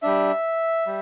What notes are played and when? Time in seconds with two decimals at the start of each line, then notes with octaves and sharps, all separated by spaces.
0.02 G3 D4 E5
0.87 G3